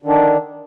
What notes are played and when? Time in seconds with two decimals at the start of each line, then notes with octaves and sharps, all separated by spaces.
0.02 D3
0.05 D#3
0.08 D4